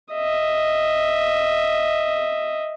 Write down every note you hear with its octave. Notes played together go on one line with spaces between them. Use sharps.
D#5 E5